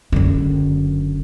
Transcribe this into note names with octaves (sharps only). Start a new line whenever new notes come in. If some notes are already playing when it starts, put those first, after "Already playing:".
F#1 D3